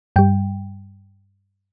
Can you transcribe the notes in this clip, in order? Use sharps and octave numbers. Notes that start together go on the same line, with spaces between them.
G2 G3 G5